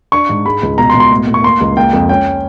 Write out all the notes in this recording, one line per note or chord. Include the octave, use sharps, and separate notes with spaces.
D4 C#6
G#2
G#3 B5
C#2
B2 A#5
C6
B2
C6
A2
A2
C#6
A#3 C6
C#2
A#3 G5
F2
C#4 G5